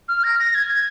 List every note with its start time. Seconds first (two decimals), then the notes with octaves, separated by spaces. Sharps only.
0.08 F6
0.24 A#6
0.39 A#6
0.55 G#6